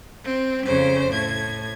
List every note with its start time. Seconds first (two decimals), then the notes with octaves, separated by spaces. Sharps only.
0.24 C4
0.64 F2 C#3 C5
1.10 A2 G#6